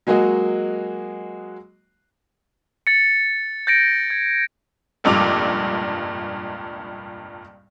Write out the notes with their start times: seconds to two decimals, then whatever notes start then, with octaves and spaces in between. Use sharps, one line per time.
0.07 F#3 G#3 A#3 F#4 D#5
2.87 A6 C#7
3.67 G6 A6 A#6 C#7 D7
4.10 G#6
5.04 F1 C#2 G2 A#2 D6 F7